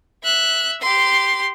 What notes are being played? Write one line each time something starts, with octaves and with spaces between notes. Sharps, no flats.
E5 F#6
G4 C6